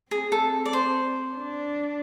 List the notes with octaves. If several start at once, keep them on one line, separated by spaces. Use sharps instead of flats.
C4 G#4
A4
D5
C5
D4